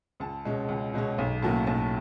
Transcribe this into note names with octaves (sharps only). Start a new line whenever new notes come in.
C#2 A5
B2 G#3 C#4
C#2
B2 G#3 C#4
B1
A2 F#3 A#3 C#4 A5
B1 A5